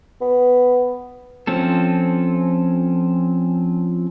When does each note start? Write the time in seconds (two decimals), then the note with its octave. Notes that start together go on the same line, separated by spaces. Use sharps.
0.21 B3
1.47 F3 C4 C#4 A4